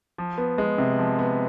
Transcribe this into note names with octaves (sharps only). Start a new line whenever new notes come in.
F3
B3
G#3
C3
F3
B3